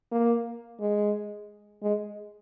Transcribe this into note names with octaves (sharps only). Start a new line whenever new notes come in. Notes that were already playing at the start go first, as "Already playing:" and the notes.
A#3
G#3
G#3